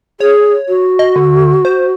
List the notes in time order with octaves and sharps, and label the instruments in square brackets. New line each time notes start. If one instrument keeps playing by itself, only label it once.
[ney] G#4 [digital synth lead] C#5
[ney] F#4
[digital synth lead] D#5
D3
C5